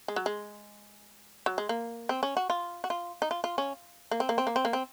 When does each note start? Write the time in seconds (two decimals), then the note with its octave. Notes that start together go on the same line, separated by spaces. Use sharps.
0.08 G#3
0.16 F#3
0.26 G#3
1.46 F#3
1.58 G#3
1.69 A#3
2.09 C4
2.23 C#4
2.37 F#4
2.50 F4
2.84 F#4
2.90 F4
3.22 D#4
3.31 F4
3.44 F4
3.58 C#4
4.11 A#3
4.20 C4
4.29 A#3
4.38 C4
4.47 A#3
4.56 C4
4.65 A#3
4.73 C4